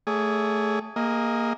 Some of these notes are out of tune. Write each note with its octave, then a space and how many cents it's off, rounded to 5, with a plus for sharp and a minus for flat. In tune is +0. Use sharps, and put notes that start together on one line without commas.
A3 +0 G#4 +0 C#5 +45
A#3 +0 G#4 -25 D#5 +20